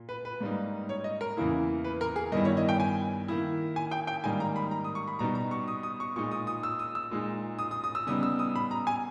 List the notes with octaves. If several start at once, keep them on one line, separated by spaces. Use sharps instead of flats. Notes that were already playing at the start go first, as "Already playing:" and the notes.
Already playing: A#2
B4
B4
G#2 G3 A#3 D#4
C#5
D#5
A#4
E2 C#3 E3 A#3 E4
B4
A#4
G#4
G2 D#3 G3 B3 E4 D#5
C#5
D#5
G5
G#5
D#3 A#3 E4
G#5
G5
G5
G#2 D#3 G3 A#3 D#4 G#5
A#5
B5
A#5
D#6
C#6
B5
B2 G3 B3 D#4 A#5
A#5
C#6
D#6
D#6
C#6
A#2 G#3 D#4 C#6
D#6
D#6
E6
D#6
E6
A#2 G#3 D#4
D#6
D#6
D#6
E6
C#3 G3 B3 D#4 D#6
E6
D#6
B5
A#5
G#5